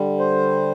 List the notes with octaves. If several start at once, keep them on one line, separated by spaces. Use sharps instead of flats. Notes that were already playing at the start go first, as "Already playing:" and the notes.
Already playing: D3 G3
C5